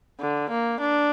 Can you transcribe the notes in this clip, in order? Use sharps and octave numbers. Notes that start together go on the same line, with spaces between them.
D3
A#3
D4